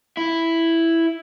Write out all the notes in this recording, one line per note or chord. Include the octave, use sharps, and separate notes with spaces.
E4